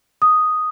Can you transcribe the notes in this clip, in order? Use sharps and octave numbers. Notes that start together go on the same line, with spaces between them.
D#6